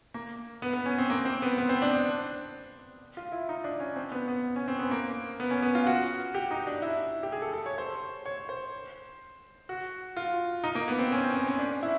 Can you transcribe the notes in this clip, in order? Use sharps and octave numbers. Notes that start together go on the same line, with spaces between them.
A#3
B3
B3
C#4
C4
A#3
C4
B3
B3
C4
D4
F4
E4
D#4
D4
C#4
C4
B3
B3
C#4
C4
B3
A#3
B3
C#4
B3
F4
F#4
G4
D#4
D4
E4
G4
G#4
A4
A4
C#5
C5
C#5
C5
F#4
F4
D#4
A#3
B3
C4
C#4
C4
C4
C#4
D4
E4